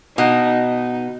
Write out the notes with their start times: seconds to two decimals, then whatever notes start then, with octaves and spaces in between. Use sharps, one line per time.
0.17 B2 D#4
0.64 D#4